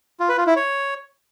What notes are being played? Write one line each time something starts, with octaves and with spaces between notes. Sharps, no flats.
F4
B4
F4
E4
C#5